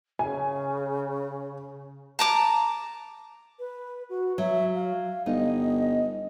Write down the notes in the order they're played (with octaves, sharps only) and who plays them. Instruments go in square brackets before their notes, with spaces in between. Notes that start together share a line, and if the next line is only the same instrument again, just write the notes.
[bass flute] C#3 [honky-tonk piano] G#5
[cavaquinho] A5 A#5 D6
[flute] B4
F#4
[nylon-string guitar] F#3 [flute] E5
[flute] F5
[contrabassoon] G1 [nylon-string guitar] D#4 [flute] D#5